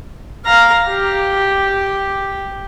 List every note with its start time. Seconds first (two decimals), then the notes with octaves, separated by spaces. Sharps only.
0.46 F5 A#5
0.88 G4